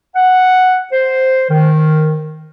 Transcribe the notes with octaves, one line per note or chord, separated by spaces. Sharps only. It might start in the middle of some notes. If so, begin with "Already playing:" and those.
F#5
C5
D#3